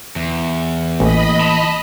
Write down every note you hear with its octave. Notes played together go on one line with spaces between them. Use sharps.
E2
A1 E3 A#3 D#5 B5
A5 C6